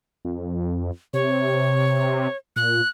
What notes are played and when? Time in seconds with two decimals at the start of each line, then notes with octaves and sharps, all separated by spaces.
0.25 F2
1.13 C3 C#5
2.56 A#2 F#6